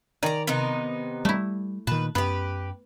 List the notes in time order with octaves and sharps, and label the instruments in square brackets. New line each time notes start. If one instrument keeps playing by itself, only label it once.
[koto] D#3 G#5 [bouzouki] D5 A#5
[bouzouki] C3 B3 D#4
[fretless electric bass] G3 [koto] A3 E4
[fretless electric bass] A#2 D#3 [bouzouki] B4 [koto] A5
[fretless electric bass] F#2 [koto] B3 [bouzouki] G4 B4